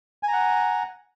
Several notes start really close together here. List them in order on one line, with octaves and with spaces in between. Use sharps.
G#5 A#5 F#5